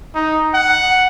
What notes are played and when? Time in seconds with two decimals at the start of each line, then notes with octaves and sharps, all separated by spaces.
0.15 D#4
0.54 F#5